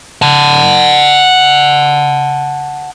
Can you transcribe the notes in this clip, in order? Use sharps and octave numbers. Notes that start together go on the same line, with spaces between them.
F#5 A5